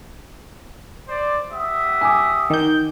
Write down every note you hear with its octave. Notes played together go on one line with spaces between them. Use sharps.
C5 D5
G4 E5 F#5 D#6
G#5 D6
D#3 G6